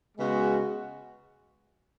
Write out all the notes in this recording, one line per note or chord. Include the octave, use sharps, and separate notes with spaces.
C#3 G#3 B3 F#4